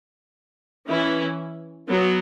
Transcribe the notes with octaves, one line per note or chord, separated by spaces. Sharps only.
E3 C#4 E4
F#3 B3